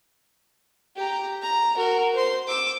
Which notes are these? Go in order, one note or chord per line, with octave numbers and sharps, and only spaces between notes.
G4 A#5
A#5
F#4 A#4
C5 C6
D6 E6